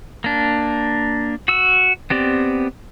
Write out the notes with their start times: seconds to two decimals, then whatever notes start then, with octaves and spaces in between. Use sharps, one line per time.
0.24 A#3 D4
1.48 F#4 E6
2.10 B3 C4 G4 D5